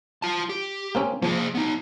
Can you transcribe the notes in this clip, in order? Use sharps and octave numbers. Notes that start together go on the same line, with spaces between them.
F4 A5
G4
A#3 C4 C#4
F3 A#3 G#4
B3 D#4